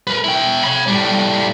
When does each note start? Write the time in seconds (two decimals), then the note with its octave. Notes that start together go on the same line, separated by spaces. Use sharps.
0.07 A#4 B4
0.24 E4 G5
0.64 C#5 B5
0.87 A2 G3